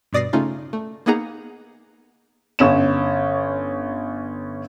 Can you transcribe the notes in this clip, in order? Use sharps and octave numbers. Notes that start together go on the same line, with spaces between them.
G2 B2 D5 D#6 A#6 C7
C#3 A3 C#4 D#4 F4
A3
A#3 B3 D#4 G#4 F#5 A#5
G1 C#4 E7